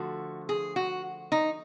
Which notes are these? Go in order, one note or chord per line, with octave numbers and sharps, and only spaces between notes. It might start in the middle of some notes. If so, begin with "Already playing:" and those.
Already playing: D3 F3 A3 F#4
G#4
F#4
D#4